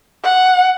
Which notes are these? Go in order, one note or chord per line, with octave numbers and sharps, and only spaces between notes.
F#5